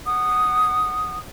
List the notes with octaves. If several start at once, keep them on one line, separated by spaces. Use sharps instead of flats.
F#5 D#6